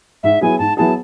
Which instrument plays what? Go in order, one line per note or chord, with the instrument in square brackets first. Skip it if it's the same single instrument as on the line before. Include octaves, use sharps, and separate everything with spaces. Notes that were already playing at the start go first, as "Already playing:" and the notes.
[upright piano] G#2 [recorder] E5
[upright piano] F#3 B3 E4 G#4 [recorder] G#5
[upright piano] G#2 [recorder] A5
[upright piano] F#3 B3 E4 G#4 [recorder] A5